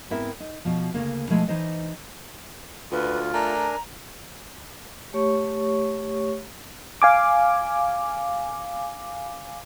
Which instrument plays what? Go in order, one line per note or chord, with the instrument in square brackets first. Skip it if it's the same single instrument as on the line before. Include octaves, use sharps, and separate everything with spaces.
[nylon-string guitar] G#2 B3 C4 E4 A#4 E5
D#4
B2 F3
D2 C#3 A#3
B2 F3 G#3 A3 E4
E3 D#4 C5 D#5
[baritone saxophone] D2 [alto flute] F4 [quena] B4
[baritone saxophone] A3 [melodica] D4 A#4 G#5 [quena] A#5
[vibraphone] A3 G4 C#5 C#6
[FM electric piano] F5 G#5 D6